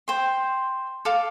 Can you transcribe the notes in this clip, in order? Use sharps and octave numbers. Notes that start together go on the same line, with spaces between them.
C5 G5 C6
A4 F5 D6